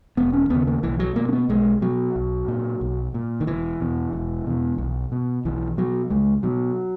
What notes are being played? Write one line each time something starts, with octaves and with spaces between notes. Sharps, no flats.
E1 B3
C#4
D#2 C#3 B3
A#3
B1 E3
F#3
B2 A#3
C#4
B3
B1 G#3
B2 F#3
B1
A#2
B1
A#2
D#3
E1 E3
E2 B2
E1
E2 B2
B1
B2
B1 E3
B2 F#3
C#2 G#3
B2 F#3